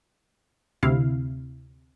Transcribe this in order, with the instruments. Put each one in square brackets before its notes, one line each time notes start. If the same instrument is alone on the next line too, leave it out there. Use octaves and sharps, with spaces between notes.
[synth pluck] D2 C3 E4 F5